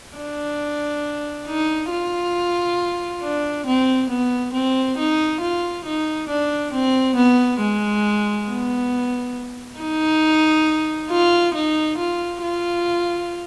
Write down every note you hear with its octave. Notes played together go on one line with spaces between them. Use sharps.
D4
D#4
F4
D4
C4
B3
C4
D#4
F4
D#4
D4
C4
B3
G#3
B3
D#4
F4
D#4
F4
F4